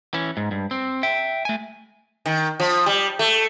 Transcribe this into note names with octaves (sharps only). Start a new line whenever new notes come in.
E3 C#4
G#2
G2
C4
E5 G5
A3 G#5
D#3
F3
G3
A3